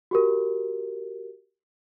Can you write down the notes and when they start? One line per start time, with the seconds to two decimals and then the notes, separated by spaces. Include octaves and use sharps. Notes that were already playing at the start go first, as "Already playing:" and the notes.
0.11 F#4 G4 A#4